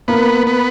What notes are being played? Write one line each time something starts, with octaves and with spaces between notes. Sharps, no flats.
A#3 B3
B3